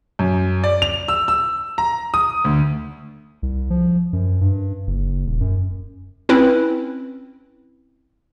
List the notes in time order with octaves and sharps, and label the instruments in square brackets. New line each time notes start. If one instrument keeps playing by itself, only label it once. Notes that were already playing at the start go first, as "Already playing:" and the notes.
[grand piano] F#2
D5
F7
E6
E6
A#5
D#6
D2
[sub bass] C2
F3
F#2
G2
F#1
D#1
F#2
[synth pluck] C4 C#4 E4 B4